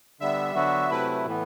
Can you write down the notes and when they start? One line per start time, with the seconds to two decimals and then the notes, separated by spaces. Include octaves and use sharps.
0.20 D3 G3 B3 E5
0.55 D3 F#3 B3 F#4
0.90 C3 F#3 A3 E4 B4
1.25 A2 E3 B3